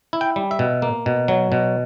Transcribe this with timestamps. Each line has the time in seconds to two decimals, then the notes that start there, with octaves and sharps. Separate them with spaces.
0.13 E4
0.21 G5
0.36 G3
0.51 E5
0.59 B2
0.82 A#3
1.06 B2
1.28 F#3
1.52 B2